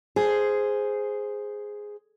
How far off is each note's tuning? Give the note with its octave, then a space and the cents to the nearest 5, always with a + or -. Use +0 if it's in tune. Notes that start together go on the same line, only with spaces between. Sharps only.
G#4 +0 C5 -5